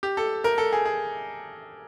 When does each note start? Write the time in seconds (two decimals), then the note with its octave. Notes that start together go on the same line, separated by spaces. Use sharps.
0.03 G4
0.17 A4
0.44 A#4
0.58 A4
0.73 G#4
0.85 G#4